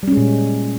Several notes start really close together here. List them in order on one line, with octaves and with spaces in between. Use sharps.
G3 C#4 G#3 A#2